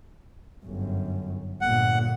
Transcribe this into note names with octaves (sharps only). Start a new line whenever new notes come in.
G1 F#2
G1 A#2 F#5